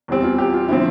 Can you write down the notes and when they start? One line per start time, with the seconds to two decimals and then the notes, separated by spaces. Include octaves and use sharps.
0.08 E2 E3 G3 C4
0.23 F4
0.38 G4
0.54 F4
0.68 D3 F3 A3 C4 E4